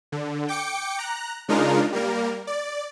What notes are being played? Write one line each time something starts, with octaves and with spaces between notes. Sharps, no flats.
D3
G5 D6 C#7
A#5 F#6
C#3 G#3 D4 D#4 F4 A#4
G3 A#3 A#4
D5